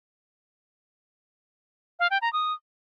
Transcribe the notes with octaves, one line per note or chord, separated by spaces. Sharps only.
F5
G5
A#5
D#6